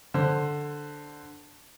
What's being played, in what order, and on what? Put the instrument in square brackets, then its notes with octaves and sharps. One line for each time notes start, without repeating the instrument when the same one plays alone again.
[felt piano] D3 C5